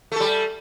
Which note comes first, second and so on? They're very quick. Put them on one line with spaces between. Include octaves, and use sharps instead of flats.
A3 A4 G3